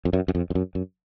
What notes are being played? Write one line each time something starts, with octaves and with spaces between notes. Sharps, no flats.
F2
F#2
F#2
F2
F2
F#2
F#2